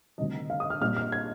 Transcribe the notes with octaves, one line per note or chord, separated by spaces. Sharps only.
D2 C3 D#3 G3 D#5
F5
D#6
F6
A#1 A#2 G3 C4 F6
F6
G#6